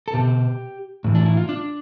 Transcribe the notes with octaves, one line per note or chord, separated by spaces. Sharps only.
A4
B2 G4
A2 E3
D4
E4
F4
D4